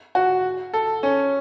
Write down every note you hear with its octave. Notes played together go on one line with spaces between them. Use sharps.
F#4
A4
C#4